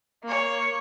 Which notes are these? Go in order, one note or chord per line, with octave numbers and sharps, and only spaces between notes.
A#3 C#5